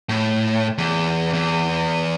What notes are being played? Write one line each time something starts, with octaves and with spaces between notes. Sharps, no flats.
A2
E2
E2